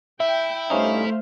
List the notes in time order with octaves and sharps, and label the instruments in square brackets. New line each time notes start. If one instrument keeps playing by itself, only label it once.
[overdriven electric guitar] E4 [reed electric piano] E5 [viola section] G5
[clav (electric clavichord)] G2 C#4 D#4 [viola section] A3 C5 F5